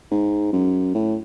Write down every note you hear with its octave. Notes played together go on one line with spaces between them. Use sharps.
G#2
F#2
A2